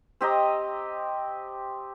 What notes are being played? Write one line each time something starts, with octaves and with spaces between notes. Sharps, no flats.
C4 G4 D#5 A#5